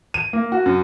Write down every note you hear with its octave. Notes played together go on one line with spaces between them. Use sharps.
D#7
A#3
F#4
F#2